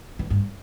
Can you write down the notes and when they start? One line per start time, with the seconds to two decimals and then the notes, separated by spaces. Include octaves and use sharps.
0.19 E3
0.30 G2